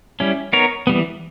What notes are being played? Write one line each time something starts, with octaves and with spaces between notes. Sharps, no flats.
G3 C#4 E4
B3 D#4 A#4 C#5
E3 G3 B3